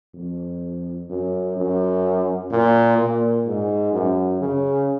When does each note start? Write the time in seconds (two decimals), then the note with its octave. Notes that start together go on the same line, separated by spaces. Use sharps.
0.14 F2
1.10 F#2
1.57 F#2
2.51 A#2
2.98 A#2
3.46 G#2
3.94 F#2
4.41 C#3